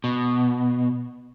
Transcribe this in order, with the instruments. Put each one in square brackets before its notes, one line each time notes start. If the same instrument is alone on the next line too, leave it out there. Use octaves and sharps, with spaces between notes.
[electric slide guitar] B2